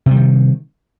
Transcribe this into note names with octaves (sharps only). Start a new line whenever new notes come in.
C3 D#3 G3